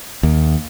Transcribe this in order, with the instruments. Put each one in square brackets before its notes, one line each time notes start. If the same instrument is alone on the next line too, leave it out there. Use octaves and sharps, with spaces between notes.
[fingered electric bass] D#2